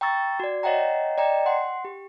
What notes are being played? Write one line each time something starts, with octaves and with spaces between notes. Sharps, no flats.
G5 A#5 C#6 E6 A6
F#4 D5
C#5 D#5 E5 F#5 G5 A#5
D5 D#5 G5 A#5
F#5 C6 C#7
G4